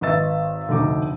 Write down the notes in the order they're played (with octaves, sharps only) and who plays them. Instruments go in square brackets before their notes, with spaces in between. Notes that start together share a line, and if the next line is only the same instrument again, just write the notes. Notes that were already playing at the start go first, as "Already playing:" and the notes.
[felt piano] G#1 B4 D#5 E5 E6 A6
F1 D2 D#4 D6